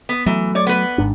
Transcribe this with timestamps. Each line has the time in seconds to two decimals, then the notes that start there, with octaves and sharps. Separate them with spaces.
0.09 B3
0.26 E3 F#3 A3
0.55 C#5 D5
0.67 B3 B4
0.98 G#1 G#2 D4